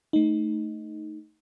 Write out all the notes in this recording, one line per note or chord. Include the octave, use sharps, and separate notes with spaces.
A3 D#4